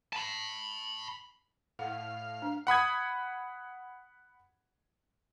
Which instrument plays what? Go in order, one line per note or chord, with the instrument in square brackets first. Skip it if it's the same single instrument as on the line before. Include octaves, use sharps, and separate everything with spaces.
[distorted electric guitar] A5 B5
[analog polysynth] A2 [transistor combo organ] F5 [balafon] F#5
[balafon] D4
[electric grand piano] F#5 B5 D#6 G#6